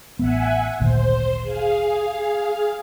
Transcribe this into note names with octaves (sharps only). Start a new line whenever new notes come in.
A1 B3 E5 F#5 G#5
G#1 D2 A#2 C5
G#4 F5